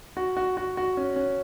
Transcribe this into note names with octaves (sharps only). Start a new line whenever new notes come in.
F#4
F#4
F#4
F#4
C#4
C#4